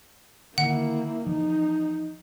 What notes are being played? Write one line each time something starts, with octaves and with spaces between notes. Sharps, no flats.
D3 D#3 A#3 E4 F#5
E3 F3 D#4